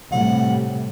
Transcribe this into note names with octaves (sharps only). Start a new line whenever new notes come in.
A2 C3 G3 F#5